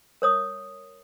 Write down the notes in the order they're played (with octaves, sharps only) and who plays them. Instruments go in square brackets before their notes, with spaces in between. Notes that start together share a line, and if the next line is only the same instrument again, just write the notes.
[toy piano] A#4 C#5 D#6